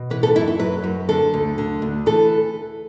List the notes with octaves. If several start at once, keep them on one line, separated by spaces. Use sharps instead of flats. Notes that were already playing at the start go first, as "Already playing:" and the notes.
Already playing: B2
E3 B4
A4
F#2 E4
E4
F#3 B4
F#2
D3 A4
D2
D3
D2
E3 A4